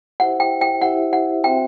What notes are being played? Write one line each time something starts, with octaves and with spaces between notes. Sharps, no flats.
E4 G4 C5 E5 F#5
G5
G5
E4 G4 C5 E5 F#5
F#5
C4 F#4 C5 E5 G5